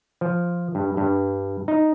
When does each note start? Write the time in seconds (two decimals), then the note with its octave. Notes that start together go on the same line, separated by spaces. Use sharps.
0.21 F3
0.75 G2
0.97 G2
1.68 D#4